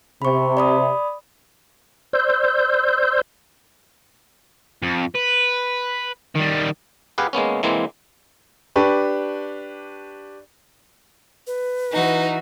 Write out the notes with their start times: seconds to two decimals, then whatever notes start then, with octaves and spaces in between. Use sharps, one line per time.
0.22 C3 B5 C#6
0.57 D5 B5 D#6
2.13 C5 D5 C6 E6 G6
4.83 F2
5.15 B4
6.36 D#3 G3
7.18 G4 G#4 B4 F5 F#5
7.33 G#3 A#3 B3 C#4
7.63 E3 G#3 A#3 C4
8.76 D4 G4 B4 C#6
11.47 B4
11.92 E3 D#4 F#4